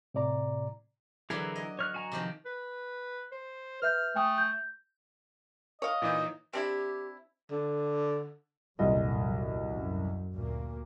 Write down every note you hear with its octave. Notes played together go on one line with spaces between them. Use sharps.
A2 C3 D5 A#5
D3 E3 F#3 E4 G#4 A#4
D#5
C#5 F6 F#6
F#4 G#5 A#5
C3 D#3 F3
B4
C5
B4 E5 F6 G6
A3 G5 G#5 D#6
G6
C#5 D#5 F5
A#2 E3 D#4
C4 D4 E4 G4
D3
D#1 C2 F#2 A#2 D#5
F#3
F#2
D2 A#2 A#3